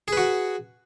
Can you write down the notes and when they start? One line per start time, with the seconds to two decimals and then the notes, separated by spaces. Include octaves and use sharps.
0.08 G#4
0.13 B4
0.17 F#4